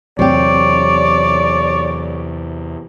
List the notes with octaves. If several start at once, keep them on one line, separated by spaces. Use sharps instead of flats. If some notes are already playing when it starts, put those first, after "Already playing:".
E2 C3 F#3 G4 C#5 D5